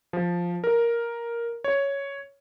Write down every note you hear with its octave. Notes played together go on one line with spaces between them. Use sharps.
F3
A#4
C#5